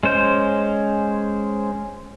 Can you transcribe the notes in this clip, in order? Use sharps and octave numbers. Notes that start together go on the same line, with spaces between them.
G#3 C#4 C5 G6